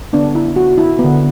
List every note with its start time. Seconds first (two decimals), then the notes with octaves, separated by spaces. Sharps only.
0.13 D3 B3 D4
0.35 E4
0.56 F#4
0.78 E4
0.99 B3
1.04 D3